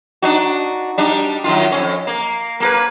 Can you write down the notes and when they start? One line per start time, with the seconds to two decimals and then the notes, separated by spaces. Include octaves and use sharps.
0.22 D4 D#4 F#4
0.98 G3 D4 D#4
1.44 F#2 D#3 F4
1.72 F2 C#4
2.07 A#3
2.60 A#3 A4 B4